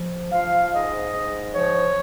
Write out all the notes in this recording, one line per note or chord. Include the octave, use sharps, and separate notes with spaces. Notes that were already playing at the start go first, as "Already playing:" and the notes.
Already playing: F3
F3 F5
G#2 D#5
G#2
F3 C#5